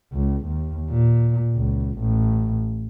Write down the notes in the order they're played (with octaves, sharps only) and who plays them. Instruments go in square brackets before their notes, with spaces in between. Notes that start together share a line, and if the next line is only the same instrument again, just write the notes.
[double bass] C#2
D#2
A#2
C#2
A1